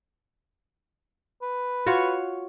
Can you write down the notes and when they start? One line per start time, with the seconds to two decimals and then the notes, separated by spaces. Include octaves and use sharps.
1.42 B4
1.86 F4 F#4 C#5